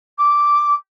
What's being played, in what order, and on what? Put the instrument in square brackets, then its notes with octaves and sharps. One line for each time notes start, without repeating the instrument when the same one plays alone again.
[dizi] D6